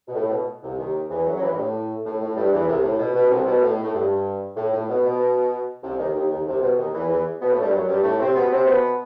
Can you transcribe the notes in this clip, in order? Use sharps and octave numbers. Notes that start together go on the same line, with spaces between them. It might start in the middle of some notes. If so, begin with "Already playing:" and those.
B2
A2
B2
C2 C3
D#2 D#3
E2 E3
F#2 F#3
F#3
E2 E3
G2
A2
A2
A2
G2 G3
E2 E3
C2 C3
A2
B2
B2
C2 C3
B2
A2
A2
G2
A2
A2
B2
B2
C2 C3
D#2 D#3
D#2 D#3
D#2 D#3
C2 C3
B2
D#2 D#3
E2 E3
E2 E3
B2 B3
A2 A3
G2 G3
F#2 F#3
G2 G3
A2 A3
C3 C4
B2 B3
C3 C4
B2 B3